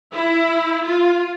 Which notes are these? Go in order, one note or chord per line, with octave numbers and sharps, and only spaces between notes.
E4
F4